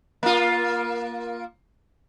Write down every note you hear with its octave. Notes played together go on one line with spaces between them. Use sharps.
A#3 F4